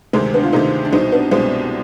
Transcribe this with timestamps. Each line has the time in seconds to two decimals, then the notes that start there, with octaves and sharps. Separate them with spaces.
0.13 D2 C3 D#3 G#3 C4
0.34 B3 D4
0.43 F4
0.53 D2 C3 D#3 C4 D#4
0.85 D4
0.93 C2 B2 C4 D#4
1.12 B3 D4
1.31 C2 B2 G#3 C4